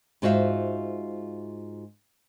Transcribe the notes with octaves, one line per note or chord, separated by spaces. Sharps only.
G#2 F4 F#4 C5 E5 F5